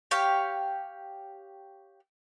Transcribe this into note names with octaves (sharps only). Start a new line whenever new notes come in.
G4 C#5 F5